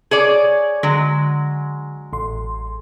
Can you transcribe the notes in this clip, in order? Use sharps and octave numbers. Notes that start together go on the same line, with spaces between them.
G#4 C#5 D5
D3 F#3 G#3
A1 C6